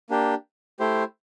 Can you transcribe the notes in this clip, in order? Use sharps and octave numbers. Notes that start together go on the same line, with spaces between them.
A#3 D4 G4
A3 E4 G4 C5